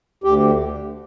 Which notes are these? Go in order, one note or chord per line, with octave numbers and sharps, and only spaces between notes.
D2 G4